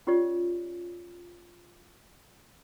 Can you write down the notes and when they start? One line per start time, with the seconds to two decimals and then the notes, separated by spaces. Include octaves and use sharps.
0.07 C#4 F4 G4 C#5 D5